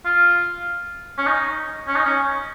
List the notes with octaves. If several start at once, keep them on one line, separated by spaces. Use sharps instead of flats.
F4
C#4
D#4
C#4
D#4
C#4